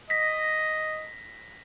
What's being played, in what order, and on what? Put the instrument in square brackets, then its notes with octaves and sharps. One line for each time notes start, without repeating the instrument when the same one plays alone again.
[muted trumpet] D#5 [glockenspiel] A#6 B6